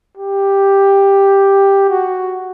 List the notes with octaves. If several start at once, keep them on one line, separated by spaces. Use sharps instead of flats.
G4
F#4